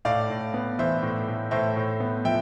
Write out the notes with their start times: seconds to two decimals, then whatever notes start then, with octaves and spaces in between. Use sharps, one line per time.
0.05 A2 D5 F5
0.30 A2
0.54 B3
0.79 E3 C5 E5
1.02 A2
1.27 A2
1.51 A2 C5 E5
1.76 A2
2.00 B3
2.25 F3 E5 G5